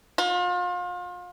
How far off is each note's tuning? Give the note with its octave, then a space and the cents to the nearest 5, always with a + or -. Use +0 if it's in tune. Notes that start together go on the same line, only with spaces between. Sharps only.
F4 +35